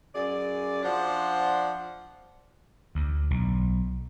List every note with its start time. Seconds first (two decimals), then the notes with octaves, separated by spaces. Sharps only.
0.14 F#2 G#4 D5
0.82 F3 D4 C5 D5 F#5
2.95 D2
3.31 B1